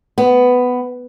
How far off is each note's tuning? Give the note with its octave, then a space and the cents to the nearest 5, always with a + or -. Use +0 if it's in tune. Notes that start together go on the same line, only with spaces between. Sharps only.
B3 +10